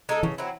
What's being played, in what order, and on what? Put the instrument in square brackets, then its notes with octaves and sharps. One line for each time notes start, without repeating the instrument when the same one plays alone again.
[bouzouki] G#3 D#4 A4
[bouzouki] C#3 [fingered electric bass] E3
[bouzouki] F#3 C4 E4